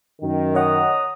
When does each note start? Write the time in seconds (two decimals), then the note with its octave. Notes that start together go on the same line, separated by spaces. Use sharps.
0.22 F#2 D#3
0.55 C#5 D#5 F#5 A#5 D#6